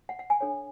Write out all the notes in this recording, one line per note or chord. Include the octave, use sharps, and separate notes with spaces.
F#5
F#5
G#5
D4 A4 C#5